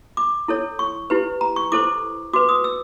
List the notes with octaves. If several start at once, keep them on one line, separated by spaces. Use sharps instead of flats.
D6
E4 A4 C#5
C#6
E4 G4 B4
A#5
C#6
E4 A4 C5 D6
F#4 B4 D6
D#6
E6